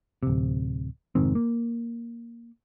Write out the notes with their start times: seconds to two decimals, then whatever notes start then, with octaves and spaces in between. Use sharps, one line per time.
0.23 D1 C3
1.15 F1 G#2 D#3 C4
1.35 A#3